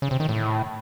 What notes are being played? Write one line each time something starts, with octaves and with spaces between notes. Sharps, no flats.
C#3
C3
D#3
A2